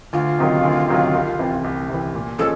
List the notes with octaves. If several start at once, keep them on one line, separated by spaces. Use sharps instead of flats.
D2 F4
C3 D#3 F#3
D2
C3 D#3 F#3
C2
C3 E3
C2
C3 E3
A#2
F3 G#3 C#4 F4 A4